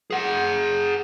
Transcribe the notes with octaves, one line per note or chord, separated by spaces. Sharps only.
G#4 F#5